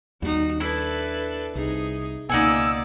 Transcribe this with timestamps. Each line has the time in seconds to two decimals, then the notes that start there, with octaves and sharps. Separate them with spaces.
0.22 D#2 G3 D#4 F#4
0.60 D4 E4 A4 B4
1.55 C2 D#4 G#4
2.29 C#2 B2 A#3 D#4 D5 F#5 G#5 E6